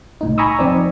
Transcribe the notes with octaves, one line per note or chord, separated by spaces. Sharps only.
C2 A2 D#4
G#5 A#5 B5 C#6 D#6 E6
F2 C4 D#4 D5